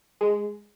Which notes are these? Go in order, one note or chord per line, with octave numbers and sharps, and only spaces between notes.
G#3